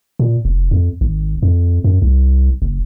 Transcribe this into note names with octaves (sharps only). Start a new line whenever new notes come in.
A#2
F1
F2
G#1
F2
F#2
C2
F#1